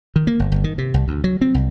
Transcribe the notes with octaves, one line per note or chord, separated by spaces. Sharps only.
D#3
A#3
G1
G1
D#3
C3
C2
D2
F#3
C4
C2